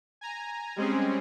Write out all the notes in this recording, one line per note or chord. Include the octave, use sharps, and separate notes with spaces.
G#5 A#5
G3 G#3 C4 C#4 G#4